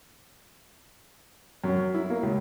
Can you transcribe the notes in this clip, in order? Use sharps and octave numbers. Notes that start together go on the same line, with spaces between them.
F#2
E4
A#3
C#2